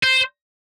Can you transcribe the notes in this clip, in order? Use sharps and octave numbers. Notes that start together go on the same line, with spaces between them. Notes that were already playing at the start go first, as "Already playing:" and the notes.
C5